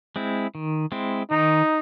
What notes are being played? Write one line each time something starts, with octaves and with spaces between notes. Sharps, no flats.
G#3 C4 E4
D#3
G#3 C4 E4
D#3 D#4